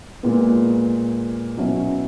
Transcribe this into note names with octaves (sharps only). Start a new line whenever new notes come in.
A#2 G#3 B3
B2 F#3 C#4 E4